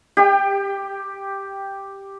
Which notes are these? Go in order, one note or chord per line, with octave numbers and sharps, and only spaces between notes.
G4 G5